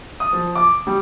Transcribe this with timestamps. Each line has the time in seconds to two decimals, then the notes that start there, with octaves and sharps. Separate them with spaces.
0.20 D#6
0.33 F3
0.55 D6
0.87 G3